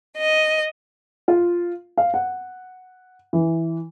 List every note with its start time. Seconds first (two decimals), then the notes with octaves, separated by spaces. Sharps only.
0.18 D#5
1.28 F4
1.98 F5
2.14 F#5
3.33 E3